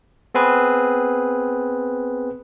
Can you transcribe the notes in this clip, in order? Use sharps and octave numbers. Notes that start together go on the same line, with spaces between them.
B3 C4 G#4 B4